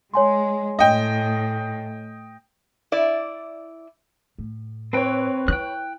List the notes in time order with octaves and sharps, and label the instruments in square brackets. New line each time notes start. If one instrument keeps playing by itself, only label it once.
[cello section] G#3 [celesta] C#5 G#5 C6
[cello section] A2 [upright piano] D#5 G5
[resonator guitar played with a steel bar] E4 D5
[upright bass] A2
[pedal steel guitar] C4 G5 [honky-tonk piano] B4 C#5
[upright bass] E4 [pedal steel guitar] G5 F#6